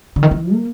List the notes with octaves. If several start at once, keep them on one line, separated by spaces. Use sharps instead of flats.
D3
D#3
E3
A#3